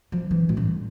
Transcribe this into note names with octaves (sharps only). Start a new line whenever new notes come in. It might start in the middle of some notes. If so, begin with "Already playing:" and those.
F3
E3
A2
G2